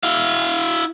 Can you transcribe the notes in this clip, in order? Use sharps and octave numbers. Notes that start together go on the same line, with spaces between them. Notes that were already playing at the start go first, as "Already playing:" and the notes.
E4 F5